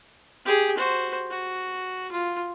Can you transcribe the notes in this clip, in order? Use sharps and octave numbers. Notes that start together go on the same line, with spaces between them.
G4 G#4
F#4 C5
F#4
F4